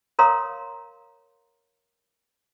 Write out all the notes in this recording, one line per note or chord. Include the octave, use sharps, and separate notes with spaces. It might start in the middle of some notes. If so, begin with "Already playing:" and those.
A#4 C#5 F5 A#5 C6 D#6